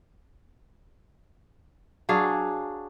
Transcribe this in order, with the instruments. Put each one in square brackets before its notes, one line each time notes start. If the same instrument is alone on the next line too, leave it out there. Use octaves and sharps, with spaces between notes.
[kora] F#3 D4 G#4 F5